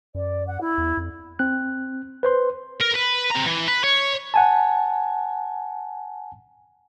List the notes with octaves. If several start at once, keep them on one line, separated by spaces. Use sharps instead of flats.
F#2 D5
F#5
E4
E2
F2
C4 F#6
B4 C5 C6
A#4
B4
C4 A#5
E3
B4
C#5
F#5 G#5 A5